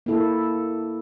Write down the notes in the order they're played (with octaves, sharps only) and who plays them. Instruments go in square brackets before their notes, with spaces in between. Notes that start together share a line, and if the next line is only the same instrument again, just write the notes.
[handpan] A#3 E4 A4